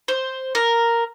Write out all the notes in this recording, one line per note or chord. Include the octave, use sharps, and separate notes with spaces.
C5
A#4